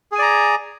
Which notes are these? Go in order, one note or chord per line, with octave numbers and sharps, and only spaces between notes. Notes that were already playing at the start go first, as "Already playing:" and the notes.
G#4 D5 G#5 A#5